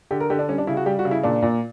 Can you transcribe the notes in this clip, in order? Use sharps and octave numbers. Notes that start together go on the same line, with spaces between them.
D3 G4
A#4
D3 G4
D4
G3 C#4
D4
C#3 E4
F#4
G3 G4
F#4
C#3
E4
A#2 D4
A#2